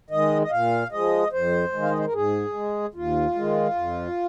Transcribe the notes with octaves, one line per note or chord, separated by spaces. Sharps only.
D#3 G#3 D#5
D#5
A#2 F5
F3 G#3 D#5
F2 C5
D#3 G#3
F5
D#5
C5
A#4
G#2 G#4
G#3
D#2 F4
D#3 G#3
F2